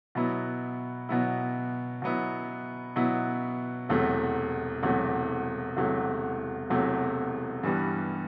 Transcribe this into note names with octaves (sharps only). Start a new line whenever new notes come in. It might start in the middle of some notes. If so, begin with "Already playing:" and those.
B2 F#3 B3 E4
B2 F#3 B3 E4
B2 F#3 B3 E4
B2 F#3 B3 E4
E1 E2 C3 F#3 A3
E1 E2 C3 F#3 A3
E1 E2 C3 F#3 A3
E1 E2 C3 F#3 A3
G2 E3 G3 B3